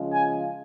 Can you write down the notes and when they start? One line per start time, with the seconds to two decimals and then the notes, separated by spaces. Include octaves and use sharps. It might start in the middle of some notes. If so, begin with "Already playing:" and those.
Already playing: C#3 F3 G#3 C#4 F4
0.13 G#5